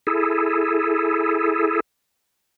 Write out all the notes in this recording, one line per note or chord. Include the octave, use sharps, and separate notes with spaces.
E4 G#4 A4